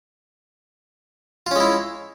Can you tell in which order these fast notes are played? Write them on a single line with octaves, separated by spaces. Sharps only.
F4 C#4 G#3 E4